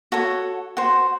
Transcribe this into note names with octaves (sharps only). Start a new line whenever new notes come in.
F#4 A4 C#5
F#4 C5